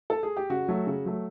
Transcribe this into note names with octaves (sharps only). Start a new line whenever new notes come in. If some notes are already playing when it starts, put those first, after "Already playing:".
A4
G#4
G4
C#3 F#4
F#3 A3
C#3
F#3 A3